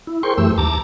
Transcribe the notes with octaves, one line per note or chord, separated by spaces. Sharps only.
E4
G#4 A#4 C5 G5 C6 C#6
F#2 E3 A3 G4 E6
D#2 A5 A#5 D6 A6